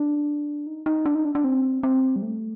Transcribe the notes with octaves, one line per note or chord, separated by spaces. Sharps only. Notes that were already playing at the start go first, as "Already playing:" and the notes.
Already playing: D4
D#4
D#4
D4
D#4
D4
D4
C4
C4
G3
A3